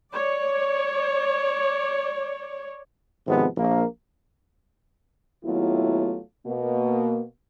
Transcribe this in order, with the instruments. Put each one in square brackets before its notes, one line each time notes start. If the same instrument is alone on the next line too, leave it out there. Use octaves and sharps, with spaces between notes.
[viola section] C#5 D5
[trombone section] G#1 C3 F3 G#3 B3
A#1 A#3
[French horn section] D#2 F#3 A3 B3 E4 F4
B2 A#3